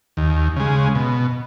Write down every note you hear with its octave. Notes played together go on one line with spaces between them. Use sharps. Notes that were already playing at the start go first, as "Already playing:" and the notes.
D#2
C#3 G#3
B2